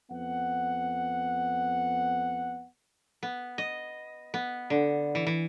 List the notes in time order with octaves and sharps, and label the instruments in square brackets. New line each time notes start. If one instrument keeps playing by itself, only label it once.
[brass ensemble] F2 B3 F#5
[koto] B3
D#5
B3
D3
E3
E3